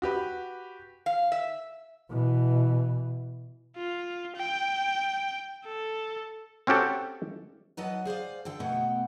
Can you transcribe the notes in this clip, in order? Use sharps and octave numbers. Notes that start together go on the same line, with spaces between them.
F#4 G4 B4
F5
E5
B2 E3
F4
G5
A4
C4 C#4 F#4 G4 A4
F#3 B4 D#5 F#5 A5
G#4 C5 D5 F5
D3 A4 G5
B2 A3 B3 F#5 G5